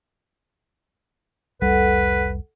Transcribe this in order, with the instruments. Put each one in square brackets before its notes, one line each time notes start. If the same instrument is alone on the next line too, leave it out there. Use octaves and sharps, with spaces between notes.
[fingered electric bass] F1 C2 G3 [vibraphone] A4 F#5 [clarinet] B4